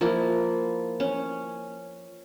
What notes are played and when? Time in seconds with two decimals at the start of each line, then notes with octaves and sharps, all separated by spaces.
0.01 F3 A#3 E4
1.00 C#4